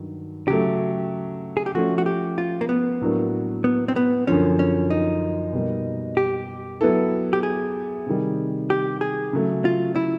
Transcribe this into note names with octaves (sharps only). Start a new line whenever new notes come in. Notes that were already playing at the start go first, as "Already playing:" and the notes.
Already playing: G2 D#3 F#3
C#3 F#3 A3 G4
G#4
G4
F3 A3 C#4 F#4
F#4
G4
F4
A#3
B3
A2 F#3 A#3 D4
B3
C4
B3
F#2 D3 F3 C#4
C#4
D#4
B2 G3 A#3
G4
F#3 B3 E4 A4
G4
G#4
C3 D#3 G3
G4
G#4
C#3 F#3 A3
F4
E4